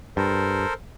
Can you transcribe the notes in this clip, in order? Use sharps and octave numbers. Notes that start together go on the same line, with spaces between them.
G2 A4 A#4 C5